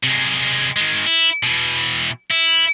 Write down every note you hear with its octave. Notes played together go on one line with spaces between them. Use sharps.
C3 G#3
D#3 G#3
E4
B2 E3
E4